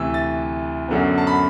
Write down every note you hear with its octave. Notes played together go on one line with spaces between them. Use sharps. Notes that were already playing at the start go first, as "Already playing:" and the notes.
Already playing: D2 C3 E3 E6
A6
F#2 D3 F#3 B3
A5
B5